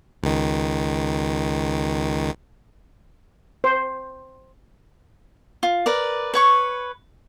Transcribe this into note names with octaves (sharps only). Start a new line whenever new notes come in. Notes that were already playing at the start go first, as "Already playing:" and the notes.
C#2 D#3
C5
F4
A#4 B4 D5
B4 C#5 C#6